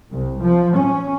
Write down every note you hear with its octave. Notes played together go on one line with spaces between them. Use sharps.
C2
F3
C#4